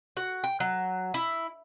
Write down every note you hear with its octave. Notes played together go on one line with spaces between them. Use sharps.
F#4
G5
F#3
E4